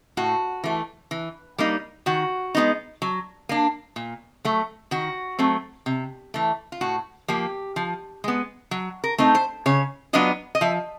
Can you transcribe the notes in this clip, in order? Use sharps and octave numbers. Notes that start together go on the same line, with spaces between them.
A2 F#4
E3 A3
E3
G3 A#3 D#4
D#3 F#4
G#3 B3 D#4
F#3
A#3 D4
A#2
F#3 A3
D#3 F#4
F#3 A3 C4
C3
E3 A3
F4
A2 F#4
F3 A#3 G4
F3
G#3 B3
F#3
A#4
A3 C4 D#4
C5
C#3 C#5
F#3 B3 D4 F4 D#5
D#5
F3 E5